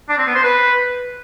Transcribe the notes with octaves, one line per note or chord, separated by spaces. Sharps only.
D4
C4
B3
C5
B4